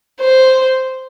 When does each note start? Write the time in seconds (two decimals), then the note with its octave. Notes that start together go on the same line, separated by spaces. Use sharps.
0.21 C5